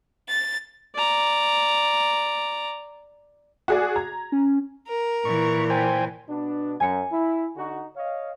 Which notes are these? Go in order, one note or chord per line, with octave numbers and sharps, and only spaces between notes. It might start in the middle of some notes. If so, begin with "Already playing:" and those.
A6
D5 A#5
F#4 G#4 D5
A#5 G#6
C#4
A#4
A#2 E3 C#6
C5 G5 G#5
B2 B3 D4
F#2 G#5 C#7
E4
D3 D#4 F#4
C#5 D#5 F5